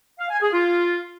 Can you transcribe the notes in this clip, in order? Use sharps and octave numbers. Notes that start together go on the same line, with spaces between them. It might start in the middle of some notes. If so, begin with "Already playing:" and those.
F5
G#5
G#4
F4